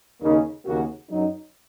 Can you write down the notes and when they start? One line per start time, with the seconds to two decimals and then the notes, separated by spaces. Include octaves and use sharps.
0.20 D#2 C#3 A#3 D#4
0.65 D#2 C#3 A#3 F#4
1.09 F#2 F#3 D#4